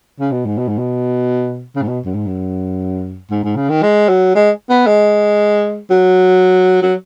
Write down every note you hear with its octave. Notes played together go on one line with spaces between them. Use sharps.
C#3
B2
G#2
B2
G#2
B2
C#3
G#2
B2
F#2
G#2
F#2
G#2
G#2
C#3
D#3
G#3
F#3
G#3
B3
G#3
F#3
F#3